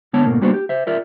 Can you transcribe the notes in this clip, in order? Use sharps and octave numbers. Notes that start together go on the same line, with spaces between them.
D3 G#3 B3 C#5 A5
G#2 B2 A3 A#3
G3 A#3 B3 D4 F#4 C5
G4
C5 E5
F4 A#4 D5 E5